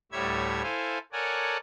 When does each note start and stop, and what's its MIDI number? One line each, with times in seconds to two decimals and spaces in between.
0.12 0.62 38
0.12 0.62 45
0.12 0.62 55
0.12 0.62 73
0.12 0.62 76
0.12 0.62 92
0.63 0.98 64
0.63 0.98 69
0.63 0.98 72
0.63 0.98 77
0.63 0.98 80
1.12 1.57 69
1.12 1.57 70
1.12 1.57 73
1.12 1.57 74
1.12 1.57 78
1.12 1.57 80